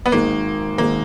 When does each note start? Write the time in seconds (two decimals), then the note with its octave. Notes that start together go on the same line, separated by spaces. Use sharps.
0.06 B3
0.12 G#1 G#2 D#3 G#3 A#3
0.78 G#1 G#2 D#3 G#3 A#3